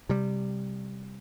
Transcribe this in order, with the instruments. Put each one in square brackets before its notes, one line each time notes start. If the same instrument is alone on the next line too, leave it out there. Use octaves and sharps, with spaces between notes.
[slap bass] C3 G3